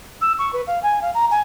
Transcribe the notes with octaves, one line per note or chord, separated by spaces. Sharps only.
E6
C#6
B4
F5
G#5
F5
A#5
G#5